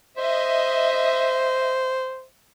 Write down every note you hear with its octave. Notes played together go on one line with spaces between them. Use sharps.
C5 D#5 E5